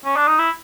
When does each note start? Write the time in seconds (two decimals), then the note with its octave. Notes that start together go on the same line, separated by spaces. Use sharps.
0.05 C#4
0.16 D4
0.27 D#4
0.39 E4